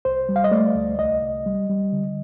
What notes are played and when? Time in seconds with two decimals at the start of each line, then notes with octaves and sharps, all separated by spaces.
0.05 C2 C5
0.29 G3
0.36 F5
0.44 D#5
0.51 A3 D5
0.75 D2
0.99 C2 D#5
1.22 C2
1.46 G3
1.70 G3
1.93 D3